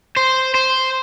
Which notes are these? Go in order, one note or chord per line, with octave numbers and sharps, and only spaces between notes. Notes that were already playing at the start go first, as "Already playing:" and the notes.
C5
C5